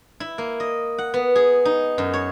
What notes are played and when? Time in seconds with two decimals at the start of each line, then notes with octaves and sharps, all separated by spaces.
0.20 E4
0.38 A#3
0.60 D#5
0.98 F#5
1.14 B3
1.35 G#4
1.65 D#4
1.98 F#2
2.14 C#5